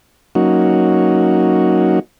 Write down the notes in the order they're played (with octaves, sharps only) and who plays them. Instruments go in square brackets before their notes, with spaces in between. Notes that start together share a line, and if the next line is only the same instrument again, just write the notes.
[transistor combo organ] F#3 A#3 C#4 D#4 F#4